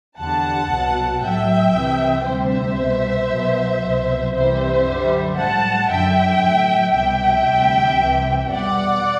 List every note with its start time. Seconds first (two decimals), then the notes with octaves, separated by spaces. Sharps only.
0.19 E2 D3 G3 F#5 A5
0.71 C2 B2 F#3
1.23 A2 F#3 E5 G5
1.75 C2 C3 E3
2.27 D2 C3 G3 C5 E5
2.79 C2 B2 G3
3.31 C2 B2 F#3
3.83 C2 B2 F#3
4.34 C2 C3 E3 G3 C5 E5
4.87 F#2 D3 G3
5.38 A2 G3 F#5 A5
5.90 F#2 D3 F#3 E5 G5
6.42 A2 F#3
6.94 C2 B2 G3 E5 G5
7.46 D2 C3 G3
7.98 C2 C3 E3
8.50 E2 B2 G3 D5 F#5